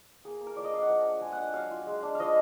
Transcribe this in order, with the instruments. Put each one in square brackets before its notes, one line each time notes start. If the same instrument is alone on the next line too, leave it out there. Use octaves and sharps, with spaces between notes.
[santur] A#3 G#4
A#3
A#4
F3 D5
D#5
D4 F5
F#5
F3
D4
G#3 G#5
F#5
D4
F#5
F#3 F5
F4
G#3
D4
F3 D#5 F5